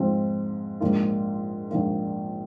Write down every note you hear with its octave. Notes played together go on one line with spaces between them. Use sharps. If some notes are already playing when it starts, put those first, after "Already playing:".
Already playing: G#2 F3 C4
A#1 G#2 F3 A#3 F4
A#1 G#2 F3 A#3 F4